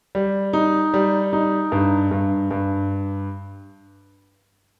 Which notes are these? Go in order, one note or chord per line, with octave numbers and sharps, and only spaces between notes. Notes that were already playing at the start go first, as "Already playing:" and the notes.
G3
D#4
G3
D#4
G2
G2
G2